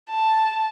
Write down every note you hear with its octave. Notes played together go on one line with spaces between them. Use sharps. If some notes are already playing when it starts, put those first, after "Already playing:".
A5